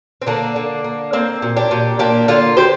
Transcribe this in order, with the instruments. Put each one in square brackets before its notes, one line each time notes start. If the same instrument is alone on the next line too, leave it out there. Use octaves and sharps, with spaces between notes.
[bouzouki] C4
D3 A#3 D4
D3
A#3
A#3 C4
A#2
D4 G4
A#2
A#3 D4 G4
D3 F4 A#4
D3 G4 C5